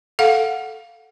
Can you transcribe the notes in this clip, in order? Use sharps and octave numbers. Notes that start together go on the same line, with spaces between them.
A4 F5 F#5